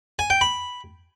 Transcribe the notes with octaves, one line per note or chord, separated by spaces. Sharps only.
G#5
G5
B5